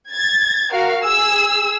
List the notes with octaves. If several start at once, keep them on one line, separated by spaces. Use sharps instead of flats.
G#6 A6
F#4 A#4 F5
G#4 E6